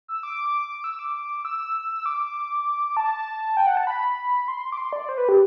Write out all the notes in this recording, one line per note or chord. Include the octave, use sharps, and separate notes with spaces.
E6
D6
E6
D6
E6
D6
A5
G5
F#5
A5
B5
C6
D6
C6
D5
C5
B4
G4